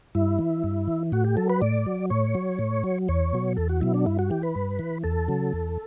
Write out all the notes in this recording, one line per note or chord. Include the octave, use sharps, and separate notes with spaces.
G2 E4
E3
G2
E3
A2 F#4
G4
F#3 A4
B4
A2 D5
F#3
A2 C#5
F#3
A2
F#3
E2 C#5
B2 F#3
E2 A4
F#4
B2 F#3 E4
D4
G2 E4
F#4
E3 G4
B4
G2
E3
E2 A4
C#3 F#3
E2